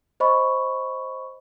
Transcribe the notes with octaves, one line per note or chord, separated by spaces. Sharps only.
C5 D#5 B5 C#6